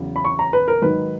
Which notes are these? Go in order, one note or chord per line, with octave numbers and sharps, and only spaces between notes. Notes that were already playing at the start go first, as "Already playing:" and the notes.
Already playing: E2 C#3 F#3
B5
C#6
A#5
B4
A#4
G#2 D#3 F#3 B4